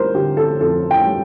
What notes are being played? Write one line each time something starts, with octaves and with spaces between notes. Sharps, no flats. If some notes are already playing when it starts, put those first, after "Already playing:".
Already playing: G3 A#4 C5
D3 G4
A4
F2 A4
G5
G3